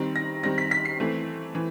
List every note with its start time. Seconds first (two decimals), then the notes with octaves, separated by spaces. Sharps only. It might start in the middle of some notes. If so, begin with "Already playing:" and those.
Already playing: D#3 G3 C4
0.16 A#6
0.43 D#3 G3 C4 A#6
0.58 B6
0.71 B6
0.85 C7
1.00 E3 A3 C4
1.55 E3